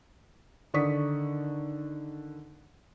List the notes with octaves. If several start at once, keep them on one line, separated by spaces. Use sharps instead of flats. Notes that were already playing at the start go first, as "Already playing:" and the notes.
D3 D#3 D5 C#6 D#6 B6